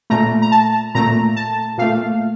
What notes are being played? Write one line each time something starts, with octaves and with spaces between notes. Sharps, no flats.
A#2 A3 A#5
A#5
A5
A#2 A3 A#5
A5
A#2 A3 F5